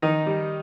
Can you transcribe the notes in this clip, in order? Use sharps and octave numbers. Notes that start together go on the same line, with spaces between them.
D#3 D#4
G3